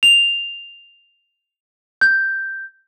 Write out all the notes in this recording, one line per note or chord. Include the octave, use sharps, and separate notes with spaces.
F7
G6